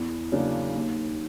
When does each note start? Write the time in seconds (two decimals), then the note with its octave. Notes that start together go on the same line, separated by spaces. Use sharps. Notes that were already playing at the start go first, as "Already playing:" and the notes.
Already playing: E2 E4
0.32 C#3 F#3 A#3 D4
0.75 D#2 D#4